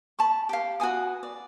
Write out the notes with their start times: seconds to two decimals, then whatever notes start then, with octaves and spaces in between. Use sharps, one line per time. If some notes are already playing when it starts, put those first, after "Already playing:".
0.19 A5 B5 C#6
0.49 G4 F5
0.80 F#4 B4 G#5 D#6
1.23 D5